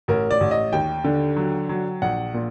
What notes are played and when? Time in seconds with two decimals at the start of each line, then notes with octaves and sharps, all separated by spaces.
0.08 A1 A#4
0.31 D5
0.41 A1
0.51 D#5
0.73 D#2 G5
1.04 D3
1.37 F#3
1.69 F#3
2.02 A#1 F#5
2.34 A#2